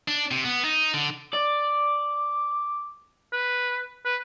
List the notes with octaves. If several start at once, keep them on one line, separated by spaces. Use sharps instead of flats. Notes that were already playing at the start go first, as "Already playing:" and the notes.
D4
C3
B3
D#4
D3
D5 D6
B4
B4